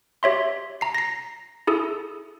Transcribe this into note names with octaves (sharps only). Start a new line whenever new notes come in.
G4 C#5 E5 C6
A#5 C7
A#6 C7
E4 G#4 A4